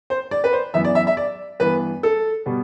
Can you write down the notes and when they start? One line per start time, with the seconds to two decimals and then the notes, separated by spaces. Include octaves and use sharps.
0.10 C5
0.31 D5
0.44 B4
0.53 C5
0.74 F#2 E3 B3 E5
0.85 D5
0.95 E5
1.07 E5
1.17 D5
1.60 G2 E3 B3 B4
2.03 A4
2.46 B2 G3 B3